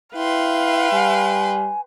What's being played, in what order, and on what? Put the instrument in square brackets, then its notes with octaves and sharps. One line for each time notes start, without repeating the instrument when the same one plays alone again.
[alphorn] E4 [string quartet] B4 G5 C6 [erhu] F5
[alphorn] G3 [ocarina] G#5